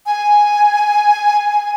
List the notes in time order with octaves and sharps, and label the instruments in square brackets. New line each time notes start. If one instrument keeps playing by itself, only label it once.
[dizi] G#5